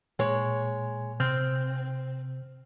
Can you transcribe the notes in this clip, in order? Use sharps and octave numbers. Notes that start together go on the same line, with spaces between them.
A#2 G#3 C#5
C3 C4 F6 G6